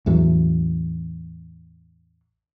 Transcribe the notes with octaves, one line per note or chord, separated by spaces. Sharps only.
A1 E2 E3 F#3